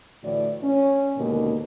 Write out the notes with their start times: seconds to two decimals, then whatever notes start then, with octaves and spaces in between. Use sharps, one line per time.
0.24 A2 D3 E3 A3 F#4 D5
0.63 C#4
1.17 D#2 G#2 B2 D3 A#3